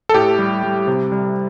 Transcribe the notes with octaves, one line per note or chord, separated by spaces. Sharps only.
A4
A2 G4
G3
G3
C3
G3